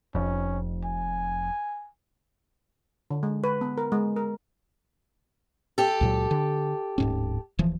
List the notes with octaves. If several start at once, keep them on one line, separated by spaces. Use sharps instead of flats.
F1 F2 C#4
G#5
D3
G#3
B4
B3
A#4
G#3
A#4
G4 A4
C#2 A#2 F#3
D3
D1 G#2 C#4
D1 E3 F3